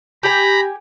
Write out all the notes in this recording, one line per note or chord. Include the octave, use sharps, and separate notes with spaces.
G4 G#5 A#5 B5